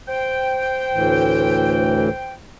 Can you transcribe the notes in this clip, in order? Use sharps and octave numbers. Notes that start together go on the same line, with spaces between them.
C5 G5
D2 A2 E3